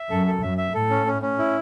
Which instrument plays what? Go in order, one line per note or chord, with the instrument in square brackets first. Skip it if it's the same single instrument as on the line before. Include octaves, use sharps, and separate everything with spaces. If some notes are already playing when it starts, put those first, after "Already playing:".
Already playing: [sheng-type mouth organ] E5
[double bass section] F#2 [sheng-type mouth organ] A4
[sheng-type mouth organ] A4
[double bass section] F#2 [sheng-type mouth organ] E5
[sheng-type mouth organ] E5
[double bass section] A2 [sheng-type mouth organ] A4
[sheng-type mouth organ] C#4
C#4
C#4
E4